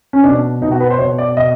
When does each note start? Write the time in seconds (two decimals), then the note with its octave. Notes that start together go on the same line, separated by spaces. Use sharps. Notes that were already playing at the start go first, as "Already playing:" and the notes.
0.13 C#4
0.24 B2 D4
0.61 B2 D#4
0.71 F#4
0.80 B4
0.90 C5
0.99 B2 C#5
1.18 D5
1.37 B2 D#5